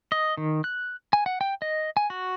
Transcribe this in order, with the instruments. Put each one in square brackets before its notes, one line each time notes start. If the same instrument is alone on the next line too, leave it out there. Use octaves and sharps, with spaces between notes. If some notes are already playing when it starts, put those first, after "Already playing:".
[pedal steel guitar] D#5
D#3
F#6
G#5
F#5
G5
D#5
G#5
F#4